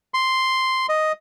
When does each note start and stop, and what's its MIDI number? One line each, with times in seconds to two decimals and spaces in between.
0.14 0.86 84
0.89 1.12 75